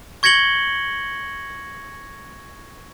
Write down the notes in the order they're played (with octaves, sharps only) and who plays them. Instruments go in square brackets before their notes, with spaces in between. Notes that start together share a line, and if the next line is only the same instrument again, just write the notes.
[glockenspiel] C#6 G#6 A#6 C#7 F#7 G7